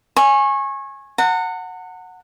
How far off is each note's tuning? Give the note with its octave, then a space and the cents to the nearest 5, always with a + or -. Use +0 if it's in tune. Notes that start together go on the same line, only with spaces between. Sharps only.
G#5 +0 C#6 -25
F#5 -5 A#5 -45